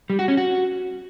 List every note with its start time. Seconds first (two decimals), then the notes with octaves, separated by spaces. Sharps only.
0.10 G3
0.19 F#4
0.28 C#4
0.37 F#4